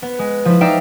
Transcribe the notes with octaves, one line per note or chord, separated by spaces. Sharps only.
B3
G#3
F3 E4
D#4 D5 E5 F5 G5